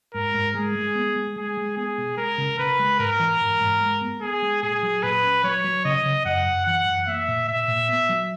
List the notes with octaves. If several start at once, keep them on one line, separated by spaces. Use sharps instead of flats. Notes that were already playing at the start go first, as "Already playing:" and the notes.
G#2 A#4
G#2
G#3 G#4
G#3
B3
G#3
G#3 G#4
G#3
B3 G#4
B2
G#3 A#4
C#3
C#3 B4
G#3
G#2 A#4
E3
G#2
G#2
G#3
B3
B3 G#4
G#3
A#2 G#4
F#3
A#2 B4
C#4
F#3 C#5
F#3
C#3 D#5
C#3
F#2 F#5
F#2
E3 F#5
F#2
A#3 E5
A#2
A#2 E5
A#2
B3
F#3